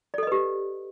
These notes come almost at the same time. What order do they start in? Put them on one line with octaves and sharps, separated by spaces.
D5 A4 D#5 B4 G4